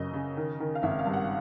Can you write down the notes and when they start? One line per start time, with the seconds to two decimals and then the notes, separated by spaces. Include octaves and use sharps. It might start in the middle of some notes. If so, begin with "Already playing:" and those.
Already playing: F#2 C#3 D#5
0.13 C#3
0.37 D#3
0.60 D#3
0.75 F5
0.83 G#1 E5
0.99 F5
1.06 G2
1.13 F#5